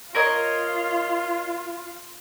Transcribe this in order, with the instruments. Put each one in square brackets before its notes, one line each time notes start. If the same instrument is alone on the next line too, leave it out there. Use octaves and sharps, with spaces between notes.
[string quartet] F4 [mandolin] A#4 C#5 D#5